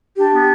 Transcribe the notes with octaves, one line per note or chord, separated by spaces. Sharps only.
D4 G4
B3